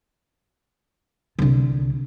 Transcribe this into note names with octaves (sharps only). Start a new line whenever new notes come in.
C2 D3